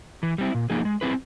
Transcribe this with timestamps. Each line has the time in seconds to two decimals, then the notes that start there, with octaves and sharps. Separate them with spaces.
0.23 E3
0.38 G3 C4 E4
0.55 A#2
0.70 F3 A#3 D#4 G#4
0.85 G#3
1.01 C4 E4 G#4 B4